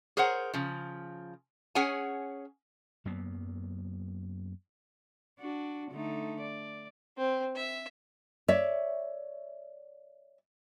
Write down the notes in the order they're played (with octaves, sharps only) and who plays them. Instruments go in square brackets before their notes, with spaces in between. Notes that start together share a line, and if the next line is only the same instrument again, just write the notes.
[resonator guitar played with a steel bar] G#4 A#4 C5 C#5 F#5
C#3 F3
C#4 G#4 C#5 F#5 G#5
[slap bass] F#2 F#3 A#3 B3
[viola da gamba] D4 F#4
D3 A3 D#4
D5
[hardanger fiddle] C4
E5
[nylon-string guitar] C#5 D5 E5